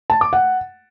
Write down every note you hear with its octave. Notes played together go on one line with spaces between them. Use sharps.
A5
D6
F#5